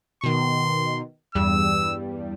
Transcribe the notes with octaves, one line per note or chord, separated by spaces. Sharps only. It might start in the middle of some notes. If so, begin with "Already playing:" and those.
B2 D#3 C6
E2 G2 G3 E6